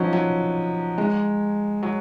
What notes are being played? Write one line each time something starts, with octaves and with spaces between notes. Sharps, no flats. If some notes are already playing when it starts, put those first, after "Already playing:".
Already playing: F3 F#3 C#4 D#4
F#3
G#3
F#3